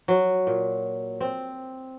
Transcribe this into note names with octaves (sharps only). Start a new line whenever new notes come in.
F#3
A#2
C4